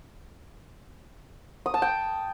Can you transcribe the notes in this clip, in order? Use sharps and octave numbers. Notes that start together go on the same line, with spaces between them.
D#6
A5
G5